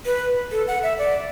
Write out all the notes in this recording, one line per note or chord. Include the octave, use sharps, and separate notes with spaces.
B4
A4
F#5
E5
D5